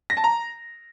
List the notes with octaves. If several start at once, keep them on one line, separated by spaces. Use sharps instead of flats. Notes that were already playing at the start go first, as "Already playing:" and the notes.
A#6
A5
A#5